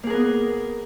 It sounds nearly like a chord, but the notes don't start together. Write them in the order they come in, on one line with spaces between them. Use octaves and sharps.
A#3 G#4 A#4 B3